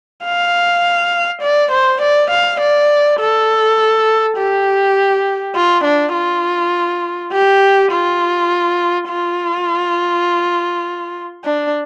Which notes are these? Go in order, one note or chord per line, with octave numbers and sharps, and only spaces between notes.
F5
D5
C5
D5
F5
D5
A4
G4
F4
D4
F4
G4
F4
F4
D4